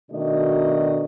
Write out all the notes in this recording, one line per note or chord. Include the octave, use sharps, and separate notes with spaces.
B2 D#3 A3 D4 F#4 D#5